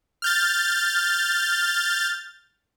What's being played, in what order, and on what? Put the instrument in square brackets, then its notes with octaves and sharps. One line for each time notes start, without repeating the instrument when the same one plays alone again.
[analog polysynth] F6 G6 A6